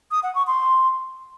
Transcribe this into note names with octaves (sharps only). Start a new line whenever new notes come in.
D#6
F#5
C#6
C6